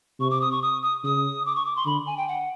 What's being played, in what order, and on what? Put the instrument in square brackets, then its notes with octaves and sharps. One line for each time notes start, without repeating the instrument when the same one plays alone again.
[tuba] C3 [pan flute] C#6
[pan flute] D6
D#6
C#6
D#6
D#6
[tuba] C#3 [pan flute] D#6
[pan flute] D6
C#6
D6
C6
[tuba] D3 [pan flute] B5
[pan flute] G#5
G5
F#5